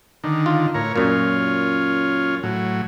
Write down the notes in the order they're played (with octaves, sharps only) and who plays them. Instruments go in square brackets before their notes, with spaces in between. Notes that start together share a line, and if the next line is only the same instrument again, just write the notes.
[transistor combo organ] D3 D#3
[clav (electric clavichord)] F4
[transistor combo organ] A2 A#4 C#5
[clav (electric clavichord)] F#2 A#2 [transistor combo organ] C#4 F4
[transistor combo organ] A2 F#3